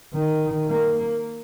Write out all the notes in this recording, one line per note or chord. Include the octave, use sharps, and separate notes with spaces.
D#3
A#3